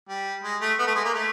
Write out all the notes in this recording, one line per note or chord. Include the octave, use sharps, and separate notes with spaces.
G3
G#3
A3
B3
A3
G#3
A#3
A3